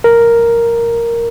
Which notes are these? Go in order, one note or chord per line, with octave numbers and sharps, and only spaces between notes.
A#4